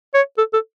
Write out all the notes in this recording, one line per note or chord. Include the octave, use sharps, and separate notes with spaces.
C#5
A4
A4